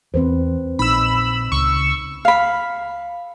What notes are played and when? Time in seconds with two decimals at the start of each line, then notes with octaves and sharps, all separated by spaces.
0.14 E2 C4 B4 C5
0.79 A#1 D#4 B5 E6
1.52 C#2 C#6 E6
2.25 F5 B5